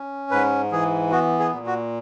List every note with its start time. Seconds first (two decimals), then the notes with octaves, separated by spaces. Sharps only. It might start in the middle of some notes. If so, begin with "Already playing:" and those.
Already playing: C#4
0.31 G#2 B4
0.72 E3 G#4
1.12 B3 F#4
1.39 G#4
1.53 A#2
1.66 F#4